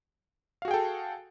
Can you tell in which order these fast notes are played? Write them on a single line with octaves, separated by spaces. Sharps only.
F5 F#4 G#4 G5 A4